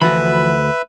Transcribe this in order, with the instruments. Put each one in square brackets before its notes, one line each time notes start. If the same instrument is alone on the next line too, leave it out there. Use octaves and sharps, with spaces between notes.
[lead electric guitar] D2 B5 [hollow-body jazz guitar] E3 F3 F#4 [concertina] B4 E5